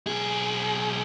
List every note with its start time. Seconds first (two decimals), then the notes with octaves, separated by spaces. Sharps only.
0.07 B1 G#4